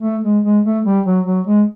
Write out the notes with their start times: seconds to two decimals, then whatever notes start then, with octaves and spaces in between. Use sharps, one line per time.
0.03 A3
0.24 G#3
0.44 G#3
0.65 A3
0.85 G3
1.06 F#3
1.26 F#3
1.47 G#3